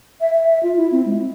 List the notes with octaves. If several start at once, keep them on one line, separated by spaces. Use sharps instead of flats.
E5
E5
E5
F4
E4
C4
G#3